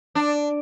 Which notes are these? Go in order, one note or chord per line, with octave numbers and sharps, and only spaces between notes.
D4